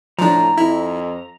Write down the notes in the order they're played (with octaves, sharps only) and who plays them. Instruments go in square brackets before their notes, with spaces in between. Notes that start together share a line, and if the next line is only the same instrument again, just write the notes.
[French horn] A2 [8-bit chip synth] F3 D4 [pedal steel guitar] A#5
[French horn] F2 [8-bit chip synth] E4